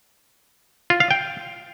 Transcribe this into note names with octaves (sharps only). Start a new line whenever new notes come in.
F4
F5
G5